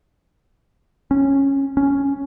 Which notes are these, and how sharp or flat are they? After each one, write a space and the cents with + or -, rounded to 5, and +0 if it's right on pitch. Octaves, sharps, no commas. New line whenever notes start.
C#4 -10
C#4 +5